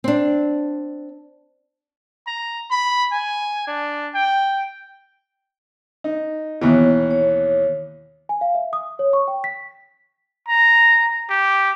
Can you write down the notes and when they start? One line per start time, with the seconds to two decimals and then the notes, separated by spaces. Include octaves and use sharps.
0.04 C4 D4
2.27 A#5
2.71 B5
3.12 G#5
3.67 D4
4.14 G5
6.04 D#4
6.61 D#2 B2 E3 B3 C#5
7.11 C#5
8.29 G#5
8.41 F5
8.55 E5
8.73 D#6
8.99 C#5
9.13 C#6
9.28 G5
9.44 B6
10.48 A#5
11.30 G4